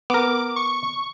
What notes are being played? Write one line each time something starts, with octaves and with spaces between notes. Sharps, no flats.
B3 A#4 D6
C#6